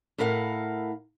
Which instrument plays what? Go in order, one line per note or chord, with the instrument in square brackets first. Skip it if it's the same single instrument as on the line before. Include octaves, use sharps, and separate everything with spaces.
[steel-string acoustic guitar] A2 E4 A#4 F5 F#5